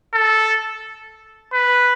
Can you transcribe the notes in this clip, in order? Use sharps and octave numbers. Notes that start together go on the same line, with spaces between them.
A4
B4